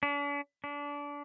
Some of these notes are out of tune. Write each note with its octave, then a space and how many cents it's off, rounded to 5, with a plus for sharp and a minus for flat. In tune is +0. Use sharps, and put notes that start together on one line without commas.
D4 -45
D4 -25